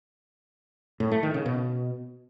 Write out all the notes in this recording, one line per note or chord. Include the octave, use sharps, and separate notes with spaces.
A2
A3
D#3
C#3
B2